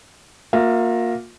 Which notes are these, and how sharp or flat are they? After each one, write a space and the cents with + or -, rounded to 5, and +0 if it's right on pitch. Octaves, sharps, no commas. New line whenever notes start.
A#3 +0 F4 +40 E5 +25